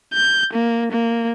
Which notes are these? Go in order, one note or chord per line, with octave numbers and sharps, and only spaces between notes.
G6
A#3
A#3